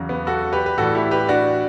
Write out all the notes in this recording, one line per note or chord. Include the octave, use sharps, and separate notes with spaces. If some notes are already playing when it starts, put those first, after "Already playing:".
Already playing: E2 C#3 F#3
B3
F#4 A4
G4 B4
B4
A2 E3 G3 F#4 A4
E4 G4
G4 B4
D4 F#4